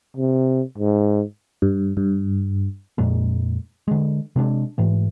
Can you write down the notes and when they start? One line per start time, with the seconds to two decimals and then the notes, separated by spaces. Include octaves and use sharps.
0.17 C3
0.78 G#2
1.62 G2
1.97 G2
2.98 F2 A#2 G#3 A#3
3.88 D3 G#3
4.36 C3 G#3 C#4 D4
4.78 G#2 E3 A3